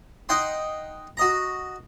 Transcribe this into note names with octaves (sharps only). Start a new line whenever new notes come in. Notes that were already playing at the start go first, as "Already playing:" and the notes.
D#4 F#5 G5 C6
F#4 D#5 A#5